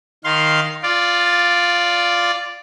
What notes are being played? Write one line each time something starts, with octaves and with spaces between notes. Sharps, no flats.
D#3 F5 C6
F4 D5